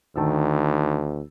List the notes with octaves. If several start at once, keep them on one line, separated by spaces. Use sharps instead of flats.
D2 D#3 A5 E6